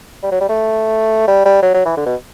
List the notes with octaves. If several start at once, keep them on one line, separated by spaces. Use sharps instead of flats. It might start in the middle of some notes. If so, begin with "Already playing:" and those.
G3
F#3
G3
A3
G3
G3
F#3
F#3
E3
D3
B2